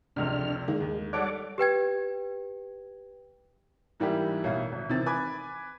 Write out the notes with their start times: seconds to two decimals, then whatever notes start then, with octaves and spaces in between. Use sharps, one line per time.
0.16 F1 C#2 C3 D4 F6
0.68 D#3 G#3 A#3
0.81 D#2
1.13 G3 A4 C#5 D5 F#5 D6
1.58 G4 B4 G5 G#6
4.00 G#2 E3 G3 A#3 E4 G4
4.44 A1 B2 E4 F5
4.72 G#1
4.89 C3 D#3 E3 C4 A6
5.06 B4 G#5 D6 G#6